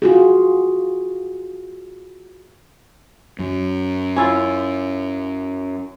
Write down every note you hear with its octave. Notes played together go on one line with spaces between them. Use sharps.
F4 F#4 G#4
F#2
C#4 E4 F4